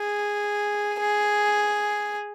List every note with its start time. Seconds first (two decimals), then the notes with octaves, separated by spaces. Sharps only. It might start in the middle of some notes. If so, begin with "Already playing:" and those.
Already playing: G#4
1.00 G#4